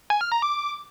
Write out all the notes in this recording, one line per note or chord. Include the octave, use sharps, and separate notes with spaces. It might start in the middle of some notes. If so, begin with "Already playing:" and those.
G#5
F6
A#5
D6